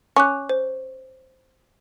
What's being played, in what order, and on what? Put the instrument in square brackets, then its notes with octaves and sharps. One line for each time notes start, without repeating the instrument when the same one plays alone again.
[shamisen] C#4 [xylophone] C#6 D6 F#6
[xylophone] C5